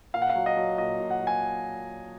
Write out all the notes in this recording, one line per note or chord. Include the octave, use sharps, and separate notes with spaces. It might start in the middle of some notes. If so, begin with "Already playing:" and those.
A#2 F5
F#5
F5
F#3
D#5
F#3
A#2 D#5
A#2
F#5
F#3
G#5